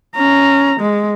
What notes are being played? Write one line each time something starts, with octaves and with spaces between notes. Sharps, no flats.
C#4 A#5
G#3